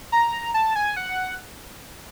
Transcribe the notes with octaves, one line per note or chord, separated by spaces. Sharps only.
A#5
A5
G#5
F#5